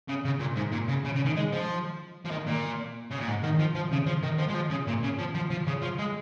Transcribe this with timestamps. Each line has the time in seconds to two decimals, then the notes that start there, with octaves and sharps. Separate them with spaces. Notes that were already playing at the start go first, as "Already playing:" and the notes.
0.08 C#3
0.25 C#3
0.40 A#2
0.56 G#2
0.72 A#2
0.88 C#3
1.04 C#3
1.15 C#3
1.25 D#3
1.36 G#3
1.52 F3
2.25 F3
2.31 D#3
2.47 A#2
3.11 C#3
3.19 A#2
3.28 G#2
3.43 D#3
3.59 F3
3.75 F3
3.92 C#3
4.06 F3
4.23 D#3
4.39 F3
4.49 G#3
4.55 F3
4.70 C#3
4.87 A#2
5.03 C#3
5.18 F3
5.35 F3
5.50 F3
5.67 C#3
5.82 F3
5.99 G#3